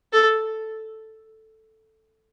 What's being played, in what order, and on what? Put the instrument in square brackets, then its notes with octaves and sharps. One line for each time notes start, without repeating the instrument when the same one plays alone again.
[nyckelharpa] A4